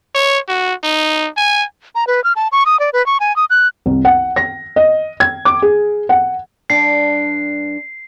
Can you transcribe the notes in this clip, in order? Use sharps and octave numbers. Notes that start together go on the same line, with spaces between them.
C#5
F#4
D#4
G#5
A#5
B4
F6
A5
C#6
D#6
D5
B4
C#6
G#5
D#6
F#6
C2
F#5
A#6
D#5
G#6
D6
G#4
F#5
G2 D4 G5 C7